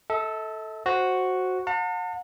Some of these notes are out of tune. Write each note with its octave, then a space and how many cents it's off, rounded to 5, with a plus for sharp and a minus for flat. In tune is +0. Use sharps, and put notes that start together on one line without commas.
A4 +0 E5 -45
F#4 +0 C5 +10
F#5 -40 A5 +45